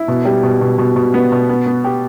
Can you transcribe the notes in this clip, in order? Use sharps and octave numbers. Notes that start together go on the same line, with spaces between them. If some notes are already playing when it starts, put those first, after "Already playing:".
Already playing: E4
B2
G3
B2
B2
B2
B2
B3
B2
B3
B3
G4